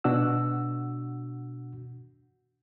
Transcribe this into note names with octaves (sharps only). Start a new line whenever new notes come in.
B2 D4 F#4 F#5 E6